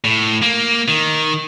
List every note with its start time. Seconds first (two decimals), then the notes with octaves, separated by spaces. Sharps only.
0.04 A2
0.42 A#3
0.88 D#3